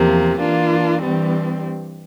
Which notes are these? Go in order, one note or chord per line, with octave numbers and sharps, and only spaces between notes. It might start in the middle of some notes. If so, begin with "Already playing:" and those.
Already playing: E2 C3 F3 A#3
E3 A#3 D4 F4
G2 E3 G3 C4